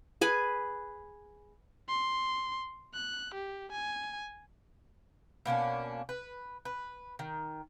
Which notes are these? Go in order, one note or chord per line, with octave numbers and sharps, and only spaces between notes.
G#4 B4 G#5
C6
F#6
G4
G#5
B2 A#3 C#4 D4
B4
B4
D#3